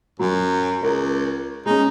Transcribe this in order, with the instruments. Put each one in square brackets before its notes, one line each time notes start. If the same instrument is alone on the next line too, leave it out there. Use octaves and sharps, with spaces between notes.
[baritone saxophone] F#2 [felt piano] F#3
[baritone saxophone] C#2 [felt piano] A#4
[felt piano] G#3 C#4 [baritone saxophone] D#4